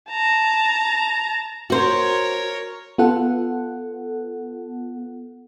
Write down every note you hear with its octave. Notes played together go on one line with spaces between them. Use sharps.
A5 A#5
F#4 A#4 C5 C#5
B3 F4 A4 F#5